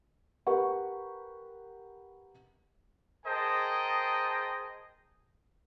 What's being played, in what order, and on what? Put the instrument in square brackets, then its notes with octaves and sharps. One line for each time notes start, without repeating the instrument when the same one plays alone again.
[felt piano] G4 A#4 B4 F#5 C#6
[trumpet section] G#4 A#4 C5 D#5 G5 A5